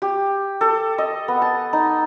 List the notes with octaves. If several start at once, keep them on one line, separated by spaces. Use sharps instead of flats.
G4
A4
D#5
B3
A5
D#4